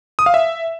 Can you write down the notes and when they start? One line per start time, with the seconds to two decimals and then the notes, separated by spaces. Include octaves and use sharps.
0.19 D#6
0.26 F5
0.34 E5